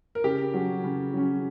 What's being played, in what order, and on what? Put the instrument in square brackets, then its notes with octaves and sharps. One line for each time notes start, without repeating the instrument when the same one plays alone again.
[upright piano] A#4
C#3 G4
F#3 C#4
C#3
F#3 C#4